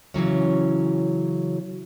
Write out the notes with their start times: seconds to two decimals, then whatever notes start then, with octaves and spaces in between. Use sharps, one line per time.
0.14 C#3 E3 F#3 C#4